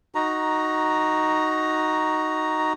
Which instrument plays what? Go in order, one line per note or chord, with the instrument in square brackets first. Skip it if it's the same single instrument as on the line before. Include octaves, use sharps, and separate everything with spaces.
[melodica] D#4 F#4 A#5